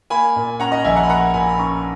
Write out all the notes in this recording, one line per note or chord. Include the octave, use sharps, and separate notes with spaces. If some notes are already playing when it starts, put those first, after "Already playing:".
A#3 G#5 B5
A#2
C#4 F#5 A#5
D#5 F#5
A#1 E5 G#5
F#5 A#5
B5
A#3 F#5 A#5
A#2 G#5 B5
B5
C#4 A#5 C#6